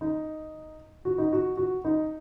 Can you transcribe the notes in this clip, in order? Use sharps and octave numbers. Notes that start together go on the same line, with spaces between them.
D#4
F#4
D#4
F#4
F#4
D#4